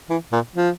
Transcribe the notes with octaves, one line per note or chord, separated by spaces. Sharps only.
E3
A#2
F3